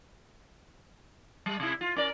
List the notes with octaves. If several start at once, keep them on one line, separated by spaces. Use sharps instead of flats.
G3
C3 E4
F4
C#4 A#4 D5